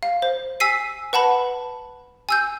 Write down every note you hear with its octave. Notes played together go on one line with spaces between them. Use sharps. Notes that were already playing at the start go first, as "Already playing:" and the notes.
F5
C5
G#5 E6 B6 C7 D#7
B4 F#5 A5 B5
G#5 E6 G6